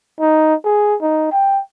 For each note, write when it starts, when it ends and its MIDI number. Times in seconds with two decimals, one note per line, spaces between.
0.21 0.55 63
0.65 0.96 68
1.01 1.32 63
1.32 1.61 79